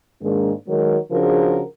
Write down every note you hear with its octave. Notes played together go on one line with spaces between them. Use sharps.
G#2 D#3 G#3 A#3 D4
D#3 F#3 G#3 A#4
C#3 F3 D4 F#4 G#4 A#4